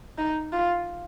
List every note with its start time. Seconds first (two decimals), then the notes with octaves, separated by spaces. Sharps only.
0.18 D#4
0.52 F4